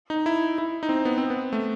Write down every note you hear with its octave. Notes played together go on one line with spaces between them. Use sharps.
D#4
E4
E4
D#4
C4
B3
C4
B3
A3